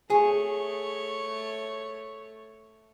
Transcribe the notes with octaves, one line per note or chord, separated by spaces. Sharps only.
A3 G#4 C#5